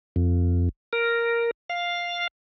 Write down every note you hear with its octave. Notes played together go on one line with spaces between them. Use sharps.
F2
A#4
F5